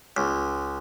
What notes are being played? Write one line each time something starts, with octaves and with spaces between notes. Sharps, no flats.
C#2